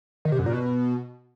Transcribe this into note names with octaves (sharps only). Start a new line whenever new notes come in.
D#3
C3
F#2
A#2
B2